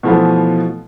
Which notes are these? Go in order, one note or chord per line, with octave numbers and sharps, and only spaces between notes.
B2 E3 F3 A3 B3